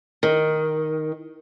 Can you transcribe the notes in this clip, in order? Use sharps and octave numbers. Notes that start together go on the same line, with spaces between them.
D#3